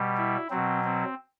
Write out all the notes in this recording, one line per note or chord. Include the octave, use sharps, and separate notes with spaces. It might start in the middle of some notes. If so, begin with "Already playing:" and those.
Already playing: B2 G3
E4
B2 F#3 C4
C4